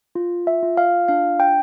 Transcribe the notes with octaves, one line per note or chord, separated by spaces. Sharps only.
F4
E5
F4
F5
D4 F5
G5